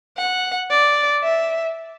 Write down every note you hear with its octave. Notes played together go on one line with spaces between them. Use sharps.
F#5
D5
E5